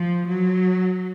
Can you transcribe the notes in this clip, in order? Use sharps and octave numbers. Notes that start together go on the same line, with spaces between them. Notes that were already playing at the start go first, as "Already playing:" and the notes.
Already playing: F3
F#3